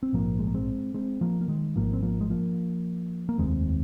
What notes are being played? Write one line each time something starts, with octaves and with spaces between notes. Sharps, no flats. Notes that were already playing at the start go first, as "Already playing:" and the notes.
C4
A#1 G#2 F3 A#3
G#3
A#3
G#3 C4
G#3 C4
F3 A#3
A#3
D#3 G#3
G#1 G#2 F3 A#3
C4
F3 A#3
G#3
F3 A#3
A#3
F1 D#2 G#3 C4